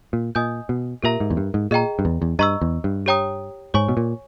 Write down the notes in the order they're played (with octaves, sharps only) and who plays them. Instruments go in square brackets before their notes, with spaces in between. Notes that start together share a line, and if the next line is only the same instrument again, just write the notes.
[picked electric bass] A#2
[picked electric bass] A#2 [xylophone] D#5 G#5 D#6 G6
[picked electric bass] B2
[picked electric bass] A#2 [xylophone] G4 A#4 E5 A#5
[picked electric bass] G#2
E2
G2
G#2
[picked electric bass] A#2 [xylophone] G#4 D#5 G5 A#5
[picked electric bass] G2
E2
E2
[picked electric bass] G2 [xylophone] D#5 A#5 C#6 E6
[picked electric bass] E2
G2
[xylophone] G4 C#5 G5 A#5 D#6
[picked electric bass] G#2 [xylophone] C#5 G#5 C#6
[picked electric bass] B2
A#2